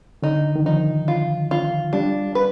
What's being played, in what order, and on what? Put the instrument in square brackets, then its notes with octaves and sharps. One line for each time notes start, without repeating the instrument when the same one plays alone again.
[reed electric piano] D3 [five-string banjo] D#4
[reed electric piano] D#3
[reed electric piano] F3 [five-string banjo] D#4
[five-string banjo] F4
F4
[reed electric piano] G3 [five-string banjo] D4
[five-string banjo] B4